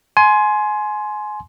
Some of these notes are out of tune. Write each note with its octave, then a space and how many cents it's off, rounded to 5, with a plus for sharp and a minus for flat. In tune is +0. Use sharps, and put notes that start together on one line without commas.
G#5 +25 C6 +0